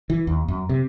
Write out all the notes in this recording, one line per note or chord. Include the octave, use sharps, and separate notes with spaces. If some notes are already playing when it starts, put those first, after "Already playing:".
E3
D#2
F#2
C3